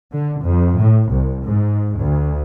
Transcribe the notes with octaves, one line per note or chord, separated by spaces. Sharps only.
D3
F2
A2
C2
G#2
D2